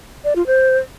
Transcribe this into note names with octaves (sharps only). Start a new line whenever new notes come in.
D5
F4
C5